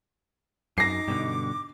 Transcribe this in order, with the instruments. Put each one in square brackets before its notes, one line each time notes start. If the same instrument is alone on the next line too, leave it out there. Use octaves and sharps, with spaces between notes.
[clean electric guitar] F#2 [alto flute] D#4 [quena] D6 [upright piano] A#6 C7
[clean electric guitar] G2 B2 D3